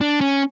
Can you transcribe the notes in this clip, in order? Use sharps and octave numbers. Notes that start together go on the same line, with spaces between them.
D4
C#4